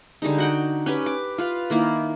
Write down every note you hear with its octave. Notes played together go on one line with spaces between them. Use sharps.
D3 G3 G#3 D#4
F#4 F#5 G5
C#4 G4 B4
D6
F4 B4 F5
D#3 A#3 E4